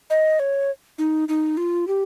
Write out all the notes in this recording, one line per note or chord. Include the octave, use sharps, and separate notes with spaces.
D#5
C#5
D#4
D#4
F4
G4